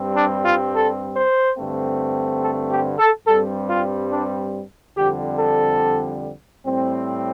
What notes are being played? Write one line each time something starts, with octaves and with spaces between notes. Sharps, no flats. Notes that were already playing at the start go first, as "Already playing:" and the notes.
Already playing: G2 G3 C4
D4
F4
A4
C5
G2 D3 A3 C4
A4
G4
A4
G2 G3 C4 A4
F4
D4
F2 D3 G3 C4 G4
A4
A2 G3 C4